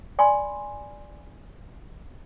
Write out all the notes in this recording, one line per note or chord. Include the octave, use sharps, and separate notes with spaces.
D5 G#5 B5 C6